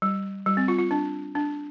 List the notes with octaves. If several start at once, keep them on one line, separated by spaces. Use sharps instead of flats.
G3
G3
C4
F4
F4
D4
D4